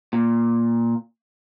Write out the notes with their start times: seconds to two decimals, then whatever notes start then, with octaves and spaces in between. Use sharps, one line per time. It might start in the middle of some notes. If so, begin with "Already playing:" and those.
0.13 A#2